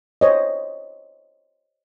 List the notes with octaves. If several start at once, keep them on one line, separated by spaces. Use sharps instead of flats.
C5 C#5 D#5